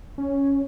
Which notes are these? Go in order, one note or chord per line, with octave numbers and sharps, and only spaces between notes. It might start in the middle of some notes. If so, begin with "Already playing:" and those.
C#4